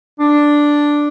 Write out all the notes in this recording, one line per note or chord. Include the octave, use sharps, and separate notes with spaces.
D4